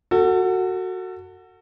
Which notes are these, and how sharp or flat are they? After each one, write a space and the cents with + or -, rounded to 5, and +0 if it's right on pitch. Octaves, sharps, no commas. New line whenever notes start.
F#4 +0 A4 +30